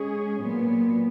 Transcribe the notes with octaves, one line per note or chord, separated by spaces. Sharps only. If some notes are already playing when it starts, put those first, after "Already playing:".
Already playing: G#3 C#4 G#4
A#2 F#3 B3